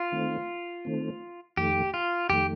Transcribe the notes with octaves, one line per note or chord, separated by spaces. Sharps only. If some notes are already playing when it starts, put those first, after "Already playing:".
Already playing: F4
D#3 A3 C4
D#3 A3 C4
F2 D#3 A3 G4
F4
F2 D#3 A3 G4